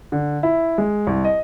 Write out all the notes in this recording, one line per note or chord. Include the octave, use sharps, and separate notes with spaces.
D3
E4
G#3
C2
D#5